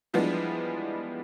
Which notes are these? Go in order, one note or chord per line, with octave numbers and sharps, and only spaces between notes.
E3 F3 G3 G#3 B3 D4